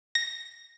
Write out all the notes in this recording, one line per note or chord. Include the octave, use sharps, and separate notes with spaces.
A#6